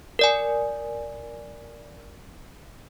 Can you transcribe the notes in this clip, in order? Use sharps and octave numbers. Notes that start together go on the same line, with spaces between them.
A#4 D5 G#5